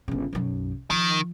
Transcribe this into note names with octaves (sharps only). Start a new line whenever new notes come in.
G1 C#3
B1 F#2
D#3 F3